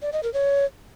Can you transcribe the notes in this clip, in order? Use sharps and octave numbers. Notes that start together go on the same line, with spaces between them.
D5
D#5
A#4
C#5